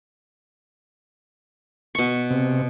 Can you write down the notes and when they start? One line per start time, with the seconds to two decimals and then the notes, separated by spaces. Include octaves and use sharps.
1.95 B2 C#6
2.31 C3